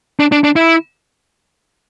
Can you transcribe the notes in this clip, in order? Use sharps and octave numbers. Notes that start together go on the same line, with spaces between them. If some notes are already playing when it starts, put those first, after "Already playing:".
D4
D4
D4
E4